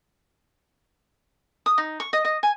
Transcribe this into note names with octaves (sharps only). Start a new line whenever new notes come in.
D#6
D#4
C#6
D#5
D#5
G#5